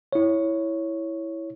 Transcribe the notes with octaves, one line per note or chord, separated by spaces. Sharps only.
E4 C#5